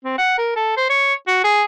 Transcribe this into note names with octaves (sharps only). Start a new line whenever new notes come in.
C4
F#5
A#4
A4
C5
C#5
F#4
G#4